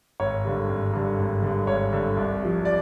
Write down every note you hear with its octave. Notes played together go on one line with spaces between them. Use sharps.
G#1 C#5
G2 D3
G#1
G2 D3
G#1
G2 D3
G#1 C#5
G2 D3
C2
C3 F3
D5